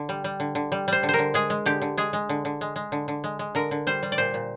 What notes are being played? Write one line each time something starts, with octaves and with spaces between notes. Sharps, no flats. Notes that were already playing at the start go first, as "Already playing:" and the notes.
Already playing: D3
G3
G3
D3
D3
G3
G3 C5
D3
A#4 C5
D3
G#3 G#4
G#3
D3 G4
D3
G#3 G#4
G#3
D3
D3
G#3
G#3
D3
D3
G#3
G#3
D3 A#4
D3
G3 C5
G3
D5
A#2 C5
A#2